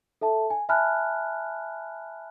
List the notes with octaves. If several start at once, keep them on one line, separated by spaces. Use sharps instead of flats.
A4 E5 A5
G#5
E5 G#5 A5 B5 F6 F#6